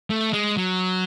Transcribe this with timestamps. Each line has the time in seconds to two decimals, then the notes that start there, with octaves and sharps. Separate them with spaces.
0.10 A3
0.33 G#3
0.57 F#3